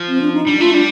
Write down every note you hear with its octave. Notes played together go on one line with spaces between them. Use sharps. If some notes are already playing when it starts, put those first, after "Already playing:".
Already playing: F3
C4
D4
D#4
G3 D4
A3 F4
G3 D4